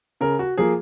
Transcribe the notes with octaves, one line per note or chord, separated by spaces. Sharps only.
C#3 A#4
F#4
F3 A#3 G#4